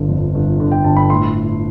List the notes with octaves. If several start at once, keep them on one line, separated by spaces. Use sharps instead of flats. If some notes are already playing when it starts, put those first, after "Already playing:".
Already playing: G1 D3
F2
G1
D3
G5
G1 A5
B5
A2 C6